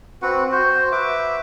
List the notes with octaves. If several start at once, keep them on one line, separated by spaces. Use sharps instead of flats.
C4 F#4 B4 F#5
F#4 C5
B4 E5 D6